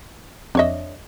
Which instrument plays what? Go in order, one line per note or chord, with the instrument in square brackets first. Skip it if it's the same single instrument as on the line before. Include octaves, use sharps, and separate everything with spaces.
[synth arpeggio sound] F2 D#5 [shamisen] D4 C#5 E5